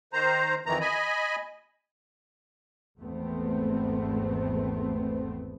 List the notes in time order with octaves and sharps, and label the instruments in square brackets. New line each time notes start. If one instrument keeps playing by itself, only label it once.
[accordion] D#3 C5 A#5
F2 D#3 E3 A#5
D#5 G#5 B5
[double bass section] G#1 E2 A3 B3 C4